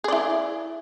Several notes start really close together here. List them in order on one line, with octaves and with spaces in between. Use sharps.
G#4 D5 E4